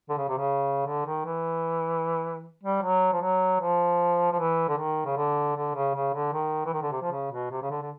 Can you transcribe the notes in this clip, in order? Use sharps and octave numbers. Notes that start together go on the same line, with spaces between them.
D3
C#3
C3
C#3
D3
D#3
E3
G3
F#3
F3
F#3
F3
F3
E3
D3
D#3
C#3
D3
D3
C#3
C#3
D3
D#3
E3
D#3
D3
C3
F3
C#3
B2
C3
C#3
D3
D3